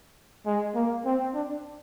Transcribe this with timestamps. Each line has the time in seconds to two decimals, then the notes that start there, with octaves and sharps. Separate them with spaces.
0.46 G#3
0.75 A#3
1.05 C4
1.34 D4